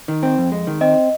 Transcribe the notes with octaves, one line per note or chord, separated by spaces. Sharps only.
D#3
C4
F2
G#3
D#3
C4 D#5